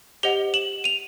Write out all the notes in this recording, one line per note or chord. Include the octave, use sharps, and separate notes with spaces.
G4 C5 D#5 F#5 F7 G7
E7 F#7
D#7 F7